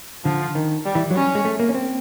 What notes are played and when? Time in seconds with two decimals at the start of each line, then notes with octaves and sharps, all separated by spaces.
0.25 D3 F3
0.55 D#3
0.85 G3
0.95 E3
1.10 F#3
1.15 G3 C#4
1.35 G#3
1.45 A3
1.60 A#3
1.69 C#4
1.75 C4